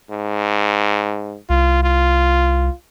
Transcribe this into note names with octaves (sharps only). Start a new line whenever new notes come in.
G#2
C2 F4
F4